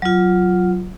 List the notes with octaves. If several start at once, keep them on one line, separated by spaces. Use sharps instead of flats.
F#3 F4